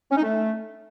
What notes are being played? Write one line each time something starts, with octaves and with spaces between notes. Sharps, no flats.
C#4
D#4
A3